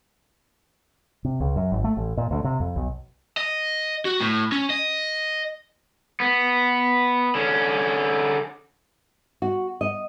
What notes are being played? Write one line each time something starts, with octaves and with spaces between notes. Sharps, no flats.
C3
C#2
F#2
G#1
A3
A1
A#2
D2
C3
F2
B1
D#5
F#4
A2
C#4
D#5
B3
D3 C#4
F#4
D#5